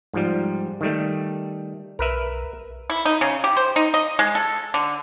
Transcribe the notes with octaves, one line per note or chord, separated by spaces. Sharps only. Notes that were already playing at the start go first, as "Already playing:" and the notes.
G#2 F3 G3
D#3 G3 A3
B1 A#4 B4 E5
E4
D#4
C#3
G4
C5
D#4
D#5
G#3
A4
D3